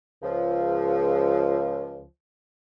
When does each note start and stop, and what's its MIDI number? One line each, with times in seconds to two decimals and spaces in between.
0.22 2.05 37
0.22 2.05 53